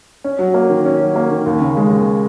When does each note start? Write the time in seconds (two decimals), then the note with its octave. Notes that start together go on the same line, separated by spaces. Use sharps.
0.24 C#4
0.39 F#3
0.54 A#3
0.70 D#3
0.86 C#4
1.01 F#3
1.16 A#3
1.30 D#3
1.46 D#2
1.61 C#3
1.77 G#3
1.91 D#2